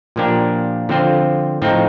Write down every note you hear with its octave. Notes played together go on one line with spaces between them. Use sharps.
A#2 F3 A#3 D4 G4
D3 F3 C4 F4 C5
A2 F3 C4 D#4